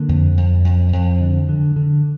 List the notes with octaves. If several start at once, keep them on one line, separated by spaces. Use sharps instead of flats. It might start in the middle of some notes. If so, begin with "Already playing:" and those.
Already playing: D3 A#3
F2
F2
F2
F2
D3
D3
D3